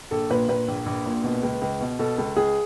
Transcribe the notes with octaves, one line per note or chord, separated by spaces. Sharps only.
A#1 A4
A#2 B4
A#2 B4
A#1
A#1
A#2
B2
C#2
C#2
B2
B2 A4
C#2
C#2 G#4